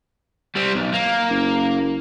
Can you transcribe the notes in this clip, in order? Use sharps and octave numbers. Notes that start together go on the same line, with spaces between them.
G3 C4
B1
A#3
F#1